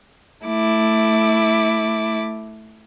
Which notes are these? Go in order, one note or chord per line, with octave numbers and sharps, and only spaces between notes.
A3 E4 D6